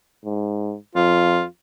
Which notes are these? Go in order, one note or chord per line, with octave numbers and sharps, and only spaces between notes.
G#2
F2 F4